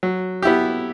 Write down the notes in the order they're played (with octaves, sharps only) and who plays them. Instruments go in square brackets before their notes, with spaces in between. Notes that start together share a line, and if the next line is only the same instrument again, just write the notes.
[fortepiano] F#3
B3 E4 G4